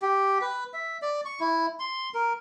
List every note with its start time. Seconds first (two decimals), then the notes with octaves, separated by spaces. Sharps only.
0.02 G4
0.42 B4
0.74 E5
1.02 D5
1.25 C#6
1.40 E4
1.79 C6
2.14 A#4